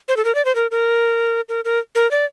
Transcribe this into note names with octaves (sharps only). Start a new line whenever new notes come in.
C5
A4
A#4
D5
C5
A#4
A#4
A#4
A#4
A#4
D5